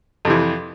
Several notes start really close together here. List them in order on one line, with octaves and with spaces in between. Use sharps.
F2 C3 E3